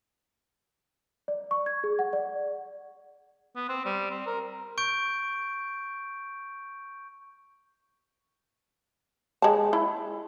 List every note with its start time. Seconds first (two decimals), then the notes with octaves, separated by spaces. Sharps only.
1.28 D5
1.51 C#6
1.66 G#6
1.84 G#4
1.99 F#5
2.13 D5
3.56 B3
3.69 C4
3.85 G3
4.10 C4
4.27 A#4
4.78 C#6 G6 D7
9.42 G#3 A5
9.73 E4